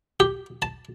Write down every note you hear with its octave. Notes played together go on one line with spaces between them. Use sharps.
G4
A5